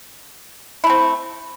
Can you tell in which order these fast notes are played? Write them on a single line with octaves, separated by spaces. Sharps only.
E4 A3 C4